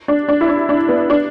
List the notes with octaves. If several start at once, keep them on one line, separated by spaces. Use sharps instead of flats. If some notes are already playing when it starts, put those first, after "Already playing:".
D4
D4
E4
D4
D4
B3
D4